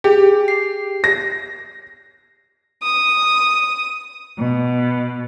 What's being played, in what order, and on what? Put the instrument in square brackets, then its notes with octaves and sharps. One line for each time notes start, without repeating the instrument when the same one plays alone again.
[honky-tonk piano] G4 [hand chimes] G#4
[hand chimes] C7
[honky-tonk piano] A#6
[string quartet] D#6
B2